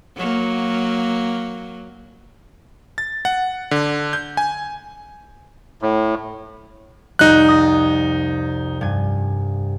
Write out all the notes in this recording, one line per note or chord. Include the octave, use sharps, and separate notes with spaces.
F#3 A#3
A6
F#5
D3
G6
G#5
A2
C2 F2 G3 D#4 F#6
D#6 A#6
G2 G#5